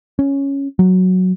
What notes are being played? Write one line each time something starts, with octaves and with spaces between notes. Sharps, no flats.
C#4
F#3